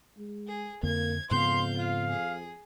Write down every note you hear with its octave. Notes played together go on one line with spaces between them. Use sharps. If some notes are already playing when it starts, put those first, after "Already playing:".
G#3
G#4
F2 D3 A#3 G#6
F2 G#2 C#3 B3 F5 C6 G6
F4 F5
G#4